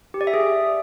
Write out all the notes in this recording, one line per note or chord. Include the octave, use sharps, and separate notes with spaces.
G4
D5
E5
G#4
E5